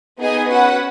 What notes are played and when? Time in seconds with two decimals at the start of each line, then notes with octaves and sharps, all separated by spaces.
0.19 B3 D#4 G#4 D#5 G#5
0.50 C#4 F#4 B4 F#5